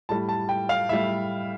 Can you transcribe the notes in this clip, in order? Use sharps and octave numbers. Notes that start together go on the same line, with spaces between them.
A2 G3 A5
A5
G5
F5
A2 G3 E5